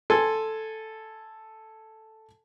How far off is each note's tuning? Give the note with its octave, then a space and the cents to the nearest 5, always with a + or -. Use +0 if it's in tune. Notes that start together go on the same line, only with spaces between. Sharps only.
A4 +0 G#5 +0 C6 +0